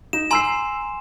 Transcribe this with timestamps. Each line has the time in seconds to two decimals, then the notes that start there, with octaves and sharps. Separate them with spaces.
0.13 D#4 E7
0.31 G#5 A#5 C6 E6 C7